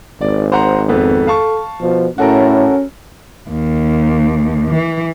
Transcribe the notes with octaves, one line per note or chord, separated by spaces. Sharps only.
G#1 D5
C5 F#5 A#5
F2 B3 A4
F5 A5 C#6
B2 F3
A2 C#4 F#4 A4 A#4
D#2
E3